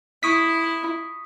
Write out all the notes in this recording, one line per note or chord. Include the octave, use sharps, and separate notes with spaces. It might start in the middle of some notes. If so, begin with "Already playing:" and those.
E4 C#6 D#6 B6